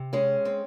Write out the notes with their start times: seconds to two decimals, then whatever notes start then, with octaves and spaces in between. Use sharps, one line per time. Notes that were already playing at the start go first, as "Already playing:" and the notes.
Already playing: C3
0.13 G#3 C#4
0.45 C4